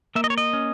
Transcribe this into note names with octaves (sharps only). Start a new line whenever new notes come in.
A#3 E5
D#5
C#5
D#5
C#4